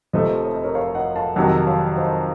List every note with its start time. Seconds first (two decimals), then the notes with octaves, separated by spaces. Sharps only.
0.13 F1 F2 C3 F3 A3 C5 D#5
0.44 C#5
0.54 D#5
0.64 A#4 C#5
0.75 C#5 F5
0.95 D#5 F#5
1.16 F5 A5
1.35 F2 C3 D#3 F#3 D#5 F#5
1.67 C#5 F5
1.97 C5 D#5